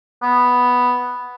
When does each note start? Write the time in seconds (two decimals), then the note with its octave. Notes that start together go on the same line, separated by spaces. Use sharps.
0.22 B3